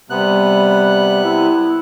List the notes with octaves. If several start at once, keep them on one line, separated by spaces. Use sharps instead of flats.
C3 G3 B3 F#6
E4